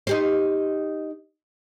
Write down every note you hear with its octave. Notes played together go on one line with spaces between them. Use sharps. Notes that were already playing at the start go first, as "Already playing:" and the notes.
D#4 G4 C5